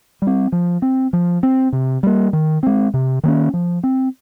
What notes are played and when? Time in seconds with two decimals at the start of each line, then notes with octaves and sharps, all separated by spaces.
0.22 G3 C4
0.52 F3
0.82 C4
1.13 F3
1.43 C4
1.73 C3
2.03 G3 A#3
2.33 D#3
2.63 G#3 C4
2.94 C3
3.24 D#3 A#3 C#4
3.54 F3
3.83 C4